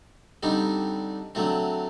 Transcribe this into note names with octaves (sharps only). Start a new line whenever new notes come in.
D3 G3 C4 D#4
D3 F#3 A3 C4